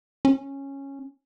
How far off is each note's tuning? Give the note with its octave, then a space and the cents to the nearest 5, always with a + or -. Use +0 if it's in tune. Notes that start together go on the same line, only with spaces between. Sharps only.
C#4 -10